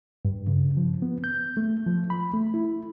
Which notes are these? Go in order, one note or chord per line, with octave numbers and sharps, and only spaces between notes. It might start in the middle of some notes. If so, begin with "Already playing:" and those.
G2
C#3
F3
B3
G6
A3
F3
B5
A3
E4